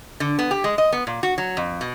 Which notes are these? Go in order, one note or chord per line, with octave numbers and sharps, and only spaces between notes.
D3
B3
G4
G#3
D#5
B3
A#2
F#4
F#3
F2
B2